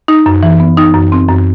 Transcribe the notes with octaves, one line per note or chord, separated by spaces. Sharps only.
D#4
F#2
E3
B3
D#4
F#2
C4
F#2